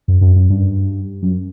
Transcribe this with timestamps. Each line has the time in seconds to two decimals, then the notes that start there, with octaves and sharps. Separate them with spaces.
0.08 F#2
0.21 F#2
0.36 F#2
0.50 G2
1.22 F#2